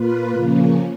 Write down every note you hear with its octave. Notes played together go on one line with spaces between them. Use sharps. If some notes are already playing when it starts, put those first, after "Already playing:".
Already playing: A#2 A#3 F4 B4
A#2 C#3 F3 A#3 C#4